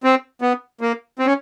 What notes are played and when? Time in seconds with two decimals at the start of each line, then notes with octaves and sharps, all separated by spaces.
0.04 C4
0.41 B3
0.81 A#3
1.19 C4
1.26 C#4